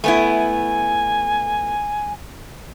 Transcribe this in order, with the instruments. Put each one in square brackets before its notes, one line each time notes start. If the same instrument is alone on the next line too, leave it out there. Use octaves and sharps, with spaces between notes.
[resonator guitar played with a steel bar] A3 B3 E4 [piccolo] G#5